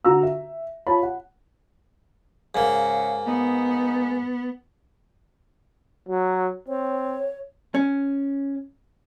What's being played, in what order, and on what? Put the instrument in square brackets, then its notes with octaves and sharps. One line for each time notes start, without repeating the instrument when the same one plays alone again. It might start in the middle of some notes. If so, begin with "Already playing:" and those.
[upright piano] D3 F#4 A#5 C#6 E6
E5
F4 C#5 A5 B5
F#5
[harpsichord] G#2 A#3 [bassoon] C#3
[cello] B3 [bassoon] D#4
[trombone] F#3
[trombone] C4 [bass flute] C#5
[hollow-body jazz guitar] C#4